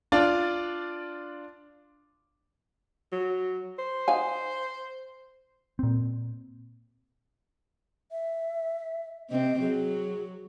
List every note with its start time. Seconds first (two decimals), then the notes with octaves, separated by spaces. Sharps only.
0.12 D4 F4 D5
3.12 F#3
3.79 C5
4.08 D#4 F5 G#5
5.79 A#2 C4
8.11 E5
9.30 C3 C4 D#5
9.61 F#3 G#4